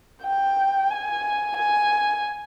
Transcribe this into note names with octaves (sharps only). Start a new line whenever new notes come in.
G5
G#5
G#5